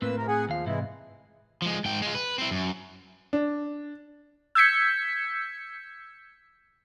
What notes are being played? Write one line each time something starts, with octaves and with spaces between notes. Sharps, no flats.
A2 A#3 C4 B4 E6
C3 A#4
G#4 F#5 G#5
D#2 F3 F5
G#2 C3 E3 G#3 E4
F3 G#3
G#2 G5
G#3 F4
B4
C4 E4
F#2
D4
E6 G6 G#6 B6 C#7